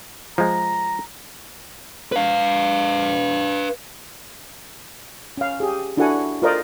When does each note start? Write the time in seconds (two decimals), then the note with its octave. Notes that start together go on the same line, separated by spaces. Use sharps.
0.38 F3 G#3 A#5
2.12 B4 F5
5.37 C#4 F5
5.60 G4 G#4
5.97 D4 E4 F#4 A4 F#5 G#5
6.42 F4 A4 A#4 C5 D5 D#5